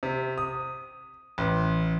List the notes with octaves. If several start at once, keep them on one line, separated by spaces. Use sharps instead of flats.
C3
D#6
A1